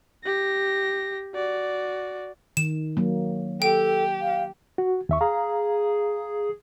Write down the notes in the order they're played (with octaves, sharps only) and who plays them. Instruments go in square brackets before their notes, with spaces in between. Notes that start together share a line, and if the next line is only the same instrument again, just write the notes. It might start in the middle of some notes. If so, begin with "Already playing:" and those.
[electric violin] G4 A#6
F#4 D5
[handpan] D#3 [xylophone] E7
[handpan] F#3 A#3
[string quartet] G4 [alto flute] A4 [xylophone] G5
[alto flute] F5
[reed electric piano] F#4
D#2 E5 C#6
[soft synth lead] G#4 [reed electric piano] F5 A#5